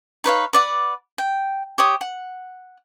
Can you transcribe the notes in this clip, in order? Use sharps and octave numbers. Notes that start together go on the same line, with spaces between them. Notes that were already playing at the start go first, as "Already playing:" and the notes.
D#4 B4 C#5 F5
B4 D5 F#5
G5
G4 C#5 D#6
F#5